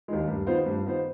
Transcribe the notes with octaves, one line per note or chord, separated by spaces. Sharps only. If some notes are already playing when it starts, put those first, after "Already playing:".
D#2 D#3 G#3
G2
D#3 B3 F4 C5
G2
D#3 B3 F4 C5